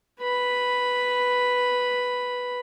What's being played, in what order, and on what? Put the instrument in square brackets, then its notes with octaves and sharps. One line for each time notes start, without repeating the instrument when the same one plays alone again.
[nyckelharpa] B4 B5